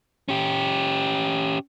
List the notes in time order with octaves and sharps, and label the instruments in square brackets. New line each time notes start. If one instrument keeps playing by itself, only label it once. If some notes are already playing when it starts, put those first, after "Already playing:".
[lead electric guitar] C#4 G4